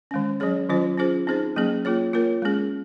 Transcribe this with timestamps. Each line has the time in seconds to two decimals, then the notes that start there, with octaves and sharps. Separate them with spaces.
0.11 D#3 G#3 C#4
0.40 F#3 C#4 G#4 C#5
0.69 D#3 F#3 C#4 F4 C5
0.98 C#4 F4 G#4 C5
1.27 C4 D#4 G#4 C5
1.56 F#3 A#3 C#4 G#4
1.85 A#3 F4 G#4 C#5
2.13 A#3 F4 A#4 C#5
2.42 G#3 C#4 G#4